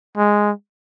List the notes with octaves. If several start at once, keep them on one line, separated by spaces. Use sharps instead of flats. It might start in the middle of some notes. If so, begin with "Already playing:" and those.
G#3